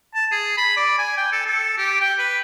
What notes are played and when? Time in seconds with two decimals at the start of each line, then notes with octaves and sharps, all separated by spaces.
0.15 A5
0.32 G#4
0.58 B5
0.77 D5
0.99 G#5
1.17 G5
1.32 A4
1.47 A4
1.78 G4
2.01 G5
2.19 B4